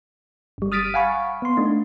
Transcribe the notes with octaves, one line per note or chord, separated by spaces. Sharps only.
G1 G3
D#6 F6 A6 B6 D7 D#7
F5 F#5 G#5 B5 C#6
B3 C6
A3 D4 D#4